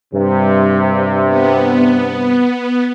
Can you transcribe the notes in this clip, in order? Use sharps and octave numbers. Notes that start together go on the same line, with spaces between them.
G2 C3
B3